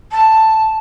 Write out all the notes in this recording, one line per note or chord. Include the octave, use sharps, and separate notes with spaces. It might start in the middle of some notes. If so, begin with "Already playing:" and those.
A5